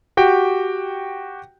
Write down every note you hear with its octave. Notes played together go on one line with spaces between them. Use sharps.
F#4 G4 G5